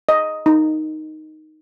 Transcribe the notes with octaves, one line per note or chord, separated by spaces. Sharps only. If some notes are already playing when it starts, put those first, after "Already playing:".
D#5
D#4